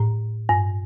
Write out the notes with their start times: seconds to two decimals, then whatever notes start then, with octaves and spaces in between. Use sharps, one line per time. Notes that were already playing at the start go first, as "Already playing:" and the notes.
Already playing: A2
0.49 G2